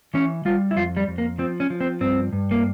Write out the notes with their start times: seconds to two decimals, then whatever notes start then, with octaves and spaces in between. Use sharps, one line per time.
0.14 E3 C#4
0.45 G3 F4
0.71 E4
0.76 F2 F4
0.97 G3
1.08 F2
1.18 A#3
1.38 F3 C4
1.60 C#4
1.70 F3
1.81 C4
2.01 G2 C4
2.33 G2
2.51 A#3